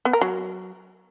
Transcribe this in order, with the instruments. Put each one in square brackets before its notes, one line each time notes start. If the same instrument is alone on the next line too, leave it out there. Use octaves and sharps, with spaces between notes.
[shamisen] B3
A#4
F#3